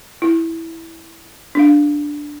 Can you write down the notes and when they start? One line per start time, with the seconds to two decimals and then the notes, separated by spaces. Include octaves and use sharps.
0.22 E4
1.55 D4 F5